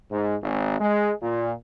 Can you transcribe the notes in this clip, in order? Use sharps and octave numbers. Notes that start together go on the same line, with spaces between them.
G#2
G#1
G#3
A#2